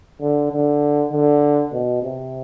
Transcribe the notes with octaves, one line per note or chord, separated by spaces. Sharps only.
D3
D3
D3
B2
C3